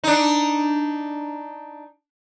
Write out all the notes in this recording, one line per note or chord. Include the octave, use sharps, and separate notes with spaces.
D4 D#4